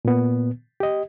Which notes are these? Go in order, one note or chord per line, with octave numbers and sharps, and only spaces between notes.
A#2 B3
G4 D#5